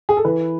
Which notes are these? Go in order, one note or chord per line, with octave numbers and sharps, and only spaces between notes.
G#4
A4
E3 B4